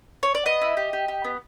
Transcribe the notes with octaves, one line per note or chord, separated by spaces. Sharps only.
C#5
D5
B3 D#5
E4
G4
G4
G4
B3